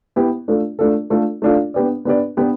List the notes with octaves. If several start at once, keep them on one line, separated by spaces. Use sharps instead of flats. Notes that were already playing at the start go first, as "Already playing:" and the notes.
B3 E4 G4
A3 D4 F4 A4
A3 D4 F4 A4
A3 D4 F4 A4
A3 D4 F4 A4
B3 D4 G4 B4 D5
B3 D4 G4 B4 D5
B3 D4 G4 B4 D5